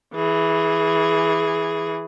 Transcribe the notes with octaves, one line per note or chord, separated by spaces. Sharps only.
E3 G#4